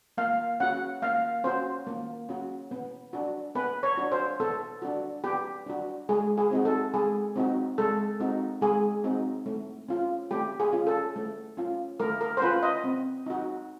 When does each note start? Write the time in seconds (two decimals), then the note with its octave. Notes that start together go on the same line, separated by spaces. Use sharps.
0.18 A#3 F5
0.60 C#4 F#4 F#5
1.02 A#3 F5
1.44 C#4 F#4 C5
1.87 A#3
2.29 C#4 F#4
2.71 B3
3.13 D4 F#4
3.55 B3 B4
3.83 C#5
3.97 D4 F#4
4.12 C5
4.40 B3 A4
4.82 D4 F#4
5.24 B3 G4
5.66 D4 F#4
6.09 G#3 G#4
6.37 G#4
6.51 C4 D#4 F#4
6.65 A4
6.94 G#3 G#4
7.36 C4 D#4 F#4
7.78 G#3 A4
8.20 C4 D#4 F#4
8.61 G#3 G#4
9.04 C4 D#4 F#4
9.46 A3
9.89 C#4 F4
10.31 A3 G4
10.60 G#4
10.73 C#4 F4
10.87 A4
11.16 A3
11.57 C#4 F4
12.00 A3 A#4
12.21 A#4
12.37 C5
12.42 C#4 F4 B4
12.63 D#5
12.84 C4
13.26 D#4 F#4